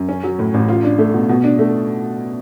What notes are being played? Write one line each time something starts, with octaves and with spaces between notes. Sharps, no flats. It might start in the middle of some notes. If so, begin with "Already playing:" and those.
Already playing: F#2
C#4
F#3
A2
A1
F4
D4
A3
B2
B2
D4
A3